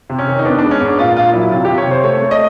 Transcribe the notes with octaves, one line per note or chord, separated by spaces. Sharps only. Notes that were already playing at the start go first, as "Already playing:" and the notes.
C3
C#4
D#3
D#4
B3 D4
G#3 D4
C#4
G#2 D4
A#2 F4
A#2 F4
F#3 E4
C3 F4
G4
C3
C#5
C3 C5
A3 C#5
A3
D#5